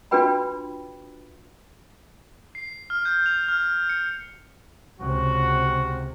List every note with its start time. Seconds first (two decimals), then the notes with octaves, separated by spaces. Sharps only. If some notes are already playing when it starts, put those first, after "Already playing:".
0.11 D4 F4 F#4 B4 G5 B5
2.55 C7
2.90 F6
3.05 G6
3.26 F7
3.49 F6
3.89 C#7
5.00 C#2 C3 F#4